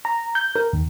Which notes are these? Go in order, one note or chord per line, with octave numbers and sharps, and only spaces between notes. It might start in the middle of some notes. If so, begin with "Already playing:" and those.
A#5
G6
A#4
D#2